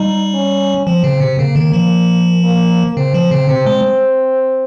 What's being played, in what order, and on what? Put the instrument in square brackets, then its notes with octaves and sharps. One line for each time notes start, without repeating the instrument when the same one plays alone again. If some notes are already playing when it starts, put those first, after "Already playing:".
Already playing: [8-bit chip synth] G3 [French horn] D#4
[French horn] C#4
[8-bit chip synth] F3 [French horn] C4
[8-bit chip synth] C#3
C3
[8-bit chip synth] C#3 [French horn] A#3
[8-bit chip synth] D#3
F3
[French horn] A#3
[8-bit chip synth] C#3 [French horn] C4
[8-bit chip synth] F3
C#3
[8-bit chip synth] C3 [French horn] C4
[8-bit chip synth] G#3